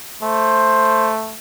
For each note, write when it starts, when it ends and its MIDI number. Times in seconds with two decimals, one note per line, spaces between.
0.23 1.38 57
0.23 1.12 72